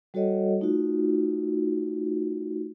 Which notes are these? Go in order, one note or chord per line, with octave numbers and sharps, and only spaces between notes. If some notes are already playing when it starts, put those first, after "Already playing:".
G3 F#4 A4 C#5 D#5 F#5
A3 D#4 F4 F#4